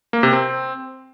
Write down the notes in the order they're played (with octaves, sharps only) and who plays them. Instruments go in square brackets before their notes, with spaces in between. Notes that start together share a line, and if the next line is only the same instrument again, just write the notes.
[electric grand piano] A#3
C3
C4